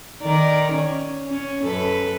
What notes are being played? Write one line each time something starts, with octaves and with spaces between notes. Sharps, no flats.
D#3 A#4 D5
C#4
C#4
F#2 A4 B4